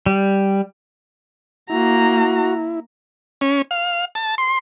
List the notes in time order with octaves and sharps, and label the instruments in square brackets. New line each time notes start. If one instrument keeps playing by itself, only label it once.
[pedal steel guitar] G3
[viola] A#3 A#5 [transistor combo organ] E4 [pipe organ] F#4
[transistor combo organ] C#4
F5
A5
C6